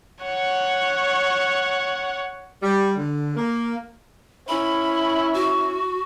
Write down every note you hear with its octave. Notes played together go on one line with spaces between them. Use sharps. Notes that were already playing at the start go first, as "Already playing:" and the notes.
C#5 F#5
G3
D3
A#3
C#4 E4 B5
F#4